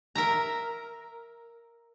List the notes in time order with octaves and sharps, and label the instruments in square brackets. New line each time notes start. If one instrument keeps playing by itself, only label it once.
[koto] A#4 E5 A#5